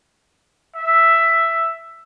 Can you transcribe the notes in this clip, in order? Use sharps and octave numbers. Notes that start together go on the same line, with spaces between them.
E5